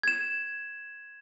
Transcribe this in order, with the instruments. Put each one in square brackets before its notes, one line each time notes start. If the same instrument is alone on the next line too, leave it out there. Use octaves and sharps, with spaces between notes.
[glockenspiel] G#6 E7